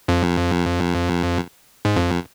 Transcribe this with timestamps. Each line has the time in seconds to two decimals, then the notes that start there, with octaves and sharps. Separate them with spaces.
0.08 F2
1.85 G#2
1.96 F2